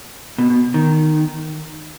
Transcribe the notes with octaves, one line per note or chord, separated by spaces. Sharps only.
B2
B2
D#3